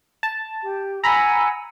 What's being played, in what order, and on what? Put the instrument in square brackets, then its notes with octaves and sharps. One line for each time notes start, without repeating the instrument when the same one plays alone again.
[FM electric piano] A5
[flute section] G4
[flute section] F#5 G#5 E6 [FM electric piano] A#5 B5